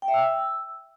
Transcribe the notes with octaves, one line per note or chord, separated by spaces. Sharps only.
G5
E5
E6